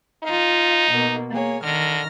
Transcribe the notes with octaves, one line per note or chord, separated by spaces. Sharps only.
D#4 F4 F5
B2 A#3
A#3 G#4 C#5
D3 D#3 F6 A#6